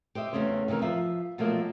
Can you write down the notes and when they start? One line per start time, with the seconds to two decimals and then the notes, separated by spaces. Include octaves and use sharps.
0.15 G4 C5 D#5 E5
0.33 E2 G2 C#3 A3 C#4 C5
0.68 C3 D#3 E3 A3 A#4
0.82 F3 C5 E5
1.38 B2 F3 F#3 A3 A#3 A4